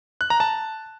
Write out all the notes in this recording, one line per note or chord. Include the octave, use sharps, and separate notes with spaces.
F#6
A#5
A5